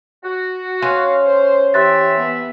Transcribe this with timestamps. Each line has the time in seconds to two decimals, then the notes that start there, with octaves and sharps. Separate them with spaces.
0.24 F#4
0.82 C#4 F5 C6
1.24 C5
1.74 E3 G4 E5 C6 F#6 A6
2.17 B3